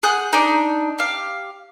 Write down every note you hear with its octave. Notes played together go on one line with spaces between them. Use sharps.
G#4 F#5 F#6 G6
D4 D#4
G4 F5